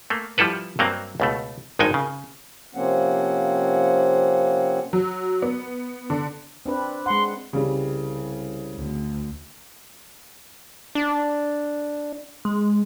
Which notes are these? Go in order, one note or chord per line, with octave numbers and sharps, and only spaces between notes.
A3 A#3
F3 G3 E4 A4 B4
G2 F#3 A#3 C4
C#2 B2 A3
G#1 G2 G#3 D#4 G5 G#5
C#3
C3 F3 A#3 C4 C#4 F#5
F#3
B3
D3
C4 D4 B4
G#3 F#5 C6
C2 C#3 G3
D2
D4
G#3